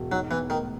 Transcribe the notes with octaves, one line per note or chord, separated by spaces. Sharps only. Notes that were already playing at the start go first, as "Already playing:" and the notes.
Already playing: E1
F#3 D#4
E3 B3
A2 D#3